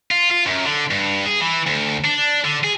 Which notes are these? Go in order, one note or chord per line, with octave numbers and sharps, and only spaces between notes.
F4
F4
F#2
D3
G2
G#4
E3
D2
D4
D3
G#4